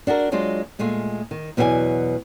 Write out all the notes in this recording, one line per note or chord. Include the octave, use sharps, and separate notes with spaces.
D4 F#4 G#4 A#4
F#3 G#3 D4 F4 C5
A#2 G#3 A3 F4 G#4
D#3
E2 B2 F#3 G4 D5 G#5